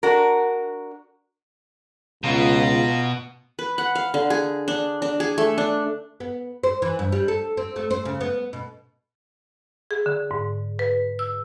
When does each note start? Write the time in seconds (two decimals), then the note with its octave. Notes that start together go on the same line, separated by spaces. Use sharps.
0.03 D4 F#4 A#4
2.24 C#2 B2 F4 A#5
3.59 B4
3.78 F#5
3.95 F5
4.14 D3
4.30 G#4
4.68 D4
5.02 D4
5.20 G#4
5.38 A3
5.58 D4
6.20 B3
6.63 C5
6.82 E3
6.99 G2
7.12 G3
7.28 A4
7.57 C4
7.76 A3
7.91 C5
8.05 C#3
8.21 B3
8.53 B2
9.91 G#4
10.06 D3
10.31 G#2
10.79 B4
11.19 E6